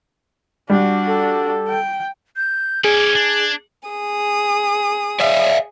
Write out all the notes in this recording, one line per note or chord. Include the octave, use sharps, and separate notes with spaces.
G3 D4 F#4
A4
G5
G6
C#4 G#4 D5 G#6
D4
G#4 D#6
D5 E5 F5